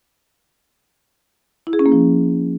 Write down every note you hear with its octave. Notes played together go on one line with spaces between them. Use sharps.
E4
G#4
C#4
A#3
F3